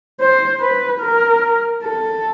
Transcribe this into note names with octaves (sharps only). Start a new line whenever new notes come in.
C5
B4
A#4
A4